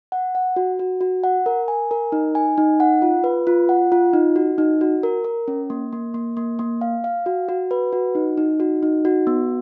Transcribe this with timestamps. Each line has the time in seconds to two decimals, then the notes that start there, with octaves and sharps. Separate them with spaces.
0.12 F#5
0.35 F#5
0.56 F#4
0.79 F#4
1.01 F#4
1.23 F#5
1.46 A#4
1.68 G#5
1.91 A#4
2.12 D#4
2.35 G#5
2.58 D#4
2.80 F#5
3.02 F4
3.24 B4
3.47 F4
3.69 F#5
3.92 F4
4.13 D#4
4.36 F#4
4.58 D#4
4.81 F#4
5.03 A#4
5.24 A#4
5.48 C#4
5.70 A#3
5.93 A#3
6.14 A#3
6.37 A#3
6.59 A#3
6.81 F5
7.04 F5
7.26 F#4
7.49 F#4
7.71 B4
7.93 F#4
8.15 D#4
8.37 D#4
8.60 F#4
8.83 D#4
9.05 F#4
9.27 B3